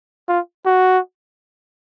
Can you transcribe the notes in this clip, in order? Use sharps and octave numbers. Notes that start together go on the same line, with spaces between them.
F4
F#4